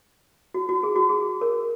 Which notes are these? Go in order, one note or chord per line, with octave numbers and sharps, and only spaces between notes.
F#4
F#4
G#4
F#4
G#4
A#4